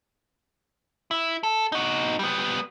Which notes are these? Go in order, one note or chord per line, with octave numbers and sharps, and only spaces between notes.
E4
A4
D#4 F#4
G3 B3